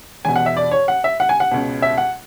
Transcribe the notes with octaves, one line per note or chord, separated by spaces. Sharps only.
E2 B2 G#5
F#5
E5
D5
C#5
F#5
E5
F#5
G#5
F#5
C#2 B2
E5
F#5